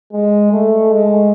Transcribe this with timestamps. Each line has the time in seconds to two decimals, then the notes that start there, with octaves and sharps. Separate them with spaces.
0.12 G#3
0.52 A3
0.92 G#3